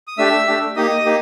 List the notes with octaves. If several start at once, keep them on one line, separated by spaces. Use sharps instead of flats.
D#6
A3 D4 G4 E5 E6
A3 D4 G4
A#3 D#4 G4 D#5 D#6
A#3 D#4 G4